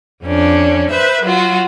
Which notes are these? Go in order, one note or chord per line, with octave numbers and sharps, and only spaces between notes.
F2 C#4 D4
B4 C5 E5
F#3 F4 F#4